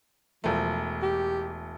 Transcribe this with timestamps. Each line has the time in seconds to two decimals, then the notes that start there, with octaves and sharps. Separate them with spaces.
0.44 E1 F3 A3
1.02 G4